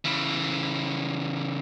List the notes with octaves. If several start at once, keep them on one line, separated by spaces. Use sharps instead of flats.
C#3 E3